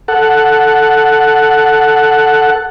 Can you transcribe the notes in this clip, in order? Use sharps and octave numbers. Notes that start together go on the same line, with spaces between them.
A4 F#5